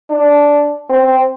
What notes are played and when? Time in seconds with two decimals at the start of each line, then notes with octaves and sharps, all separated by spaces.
0.10 D4
0.90 C4